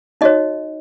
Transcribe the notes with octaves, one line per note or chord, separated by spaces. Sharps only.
D#4 F#4 C#5 D#5